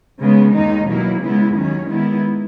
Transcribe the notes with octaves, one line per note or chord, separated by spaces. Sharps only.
C#3 G#3 B3
D#2 D#3 G#3 D#4
B2 F#3 A#3 E4
C#3 G#3 B3 E4
D#2 D#3 F#3 C#4
D#3 G#3 B3 E4